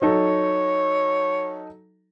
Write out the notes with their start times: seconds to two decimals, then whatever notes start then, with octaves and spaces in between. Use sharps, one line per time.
0.02 F#3 D#4 A4 C#5